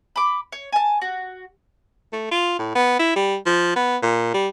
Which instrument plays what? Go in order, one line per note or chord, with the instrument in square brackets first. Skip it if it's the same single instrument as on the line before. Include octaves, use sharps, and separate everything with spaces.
[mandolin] B5 D6
C#5
G#5 A5
F#4
[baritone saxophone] A3
F4
A2
B3
E4
G3
F3
B3
A#2
G3